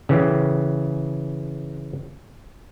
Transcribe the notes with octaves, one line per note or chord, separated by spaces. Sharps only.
C#3 E3